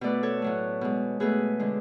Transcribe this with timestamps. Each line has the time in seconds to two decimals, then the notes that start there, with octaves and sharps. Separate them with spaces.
0.01 B2 A3 B4 D5
0.23 A4 C#5
0.42 A2 F#3 A3
0.81 B2 G#3
1.20 B2 A3 G#4 B4
1.59 D3 G#3